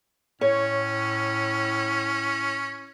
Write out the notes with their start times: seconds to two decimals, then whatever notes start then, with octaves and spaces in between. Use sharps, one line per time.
0.41 A2 C#4 C#5